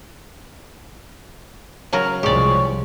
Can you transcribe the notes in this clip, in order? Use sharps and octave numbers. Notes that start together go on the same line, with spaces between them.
C#3 F#3 A#4
C2 F3 G#3 G4 C#5 D5